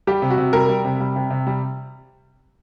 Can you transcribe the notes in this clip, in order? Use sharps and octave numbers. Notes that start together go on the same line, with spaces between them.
G3 G4
C3
F#4
C3
G3 A#4
G3
C3
G3
C3
C3
G3